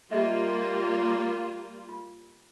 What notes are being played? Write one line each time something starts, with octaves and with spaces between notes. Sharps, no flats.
G3 A#3 F4 G4 D#5 E5
A#5 C#6 D6
F4